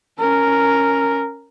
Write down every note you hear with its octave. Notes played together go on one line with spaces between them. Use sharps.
C#4 A#4